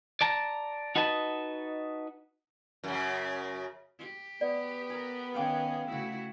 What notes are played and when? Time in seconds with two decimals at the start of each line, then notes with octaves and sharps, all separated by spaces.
0.21 D5 A5 A#5
0.96 D#4 F#4 B4 D#5 A5
2.84 F#2 C#3
3.99 G4
4.41 B3 D5
4.90 G#4 A#4
5.34 D#3 C#4 G#4 F5 G5 D6
5.88 C#3 A3 E4 F#4 E5